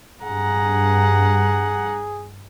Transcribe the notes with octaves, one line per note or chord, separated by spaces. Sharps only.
G2 G#4 F#5 A#5